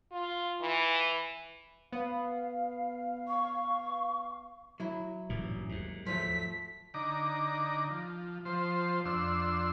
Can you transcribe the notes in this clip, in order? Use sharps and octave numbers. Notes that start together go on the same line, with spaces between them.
F4
E3
B3 F5
C#6
F#3 E4
A1 G2 A#2
D#2 G#2
F3 F#3 A3 B6
D3 D#4 A#5 D6
F3
F3 C5
F2 D4 C6 E6